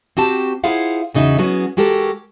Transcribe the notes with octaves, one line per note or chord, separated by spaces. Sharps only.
C4 F#4 G4 A5
E4 F4 G#4 C5 F5 F#5
E2 C#3 D#4 F#4 E5
F#3 B3 C#4 F#4 G#4
G#3 F#4 G4 A4 A#4